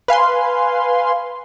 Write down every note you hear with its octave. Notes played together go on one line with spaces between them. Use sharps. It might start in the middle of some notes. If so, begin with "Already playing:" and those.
B4 F5 G#5 C6